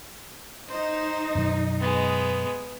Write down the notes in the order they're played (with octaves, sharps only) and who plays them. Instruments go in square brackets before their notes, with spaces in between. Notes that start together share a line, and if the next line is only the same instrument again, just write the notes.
[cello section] D#4 [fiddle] C5
[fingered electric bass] F#2 B2 F#3
[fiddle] G#3 B3